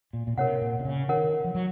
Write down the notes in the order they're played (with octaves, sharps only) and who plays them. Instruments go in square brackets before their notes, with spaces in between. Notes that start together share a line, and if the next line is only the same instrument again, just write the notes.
[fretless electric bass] A#2
A#2
[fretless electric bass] C3 [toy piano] A#4 C#5 F#5
[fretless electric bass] A#2
C3
C#3
[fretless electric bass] D#3 [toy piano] A#4 C#5 F#5
[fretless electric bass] F3
F#3